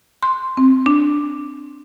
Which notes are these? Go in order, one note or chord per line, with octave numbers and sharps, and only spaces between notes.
C6
C4
D4